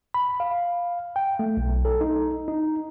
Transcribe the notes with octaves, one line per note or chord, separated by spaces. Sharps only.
B5
F5
G5
A3
B1
A4
D#4
D#4